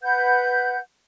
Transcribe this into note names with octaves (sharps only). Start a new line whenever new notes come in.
B4 F#5 G6